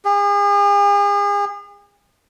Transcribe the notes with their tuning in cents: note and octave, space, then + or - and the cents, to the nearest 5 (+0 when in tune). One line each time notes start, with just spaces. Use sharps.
G#4 -40